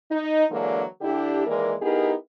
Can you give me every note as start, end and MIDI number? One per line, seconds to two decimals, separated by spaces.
0.11 0.45 63
0.51 0.84 50
0.51 0.84 52
0.51 0.84 54
0.51 0.84 56
0.51 0.84 58
0.51 0.84 62
1.01 1.46 50
1.01 1.46 62
1.01 1.46 64
1.01 1.46 67
1.47 1.74 39
1.47 1.74 52
1.47 1.74 56
1.47 1.74 58
1.47 1.74 70
1.47 1.74 74
1.82 2.13 59
1.82 2.13 63
1.82 2.13 64
1.82 2.13 67
1.82 2.13 68
1.82 2.13 70